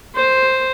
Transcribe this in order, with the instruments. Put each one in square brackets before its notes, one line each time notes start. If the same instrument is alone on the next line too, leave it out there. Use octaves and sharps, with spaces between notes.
[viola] C5